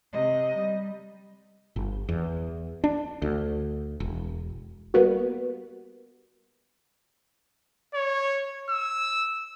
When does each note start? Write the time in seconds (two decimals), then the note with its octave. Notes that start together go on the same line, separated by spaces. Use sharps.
0.14 C3 D#5
0.57 G3
1.76 G1
2.09 E2
2.84 D4
3.22 D2
4.00 E1
4.94 G3 A#3 B3 F#4
7.94 C#5
8.69 E6